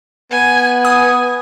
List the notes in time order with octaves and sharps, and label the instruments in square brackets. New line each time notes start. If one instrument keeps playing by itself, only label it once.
[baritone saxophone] B3 [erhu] G#5
[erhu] G#5 [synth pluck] D#6